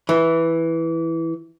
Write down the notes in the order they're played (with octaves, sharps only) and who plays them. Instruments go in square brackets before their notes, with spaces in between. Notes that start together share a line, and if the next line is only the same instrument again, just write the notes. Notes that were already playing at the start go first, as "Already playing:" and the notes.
[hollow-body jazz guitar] E3